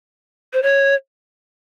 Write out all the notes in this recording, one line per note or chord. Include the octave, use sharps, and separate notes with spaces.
C5
C#5